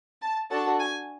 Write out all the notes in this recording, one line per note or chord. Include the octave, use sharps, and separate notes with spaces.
A5
D4 F#4 A4 A5
G#5